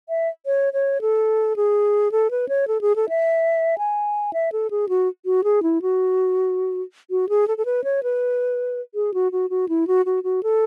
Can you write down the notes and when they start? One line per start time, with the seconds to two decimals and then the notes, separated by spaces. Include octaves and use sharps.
0.09 E5
0.46 C#5
0.73 C#5
1.01 A4
1.56 G#4
2.12 A4
2.31 B4
2.49 C#5
2.68 A4
2.81 G#4
2.96 A4
3.09 E5
3.78 G#5
4.33 E5
4.52 A4
4.71 G#4
4.89 F#4
5.25 F#4
5.44 G#4
5.63 E4
5.82 F#4
7.10 F#4
7.29 G#4
7.48 A4
7.58 A4
7.65 B4
7.84 C#5
8.03 B4
8.95 G#4
9.14 F#4
9.32 F#4
9.50 F#4
9.69 E4
9.87 F#4
10.06 F#4
10.24 F#4
10.43 A4